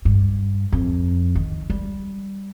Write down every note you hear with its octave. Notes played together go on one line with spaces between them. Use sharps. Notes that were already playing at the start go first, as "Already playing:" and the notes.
G2
F2
D#3
G3